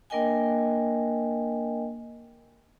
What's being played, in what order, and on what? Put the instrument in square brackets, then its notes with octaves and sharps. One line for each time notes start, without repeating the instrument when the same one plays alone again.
[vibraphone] A#3 D4 A#4 D#5 G5 G#5